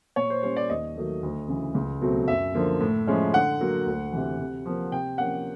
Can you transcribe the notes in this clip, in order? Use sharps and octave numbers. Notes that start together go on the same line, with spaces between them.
A#2 C#5
C5
G3 A#3 C#4 C5
D5
D#2 D#5
D#3 F#3 A3
D2
C#3 E3
C#2
B2 F#3 A3 C4
F#2 E5
D3 F3 A#3
A2
F3 G#3 C#4 E4
D3 F#5
F#3 A#3
D2
C3 E3
C3
F3 A#3
C3 G5
F3 A#3 C#4 F#5